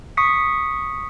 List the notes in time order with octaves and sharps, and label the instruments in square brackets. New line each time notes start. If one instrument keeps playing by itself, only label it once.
[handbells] C#6 D#6 B6 C#7